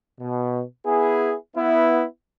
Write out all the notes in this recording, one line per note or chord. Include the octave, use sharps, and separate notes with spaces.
B2
B3 E4 G#4
B3 E4